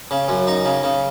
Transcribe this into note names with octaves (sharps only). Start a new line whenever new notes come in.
C#3
F#2
D#4
C#3
C#3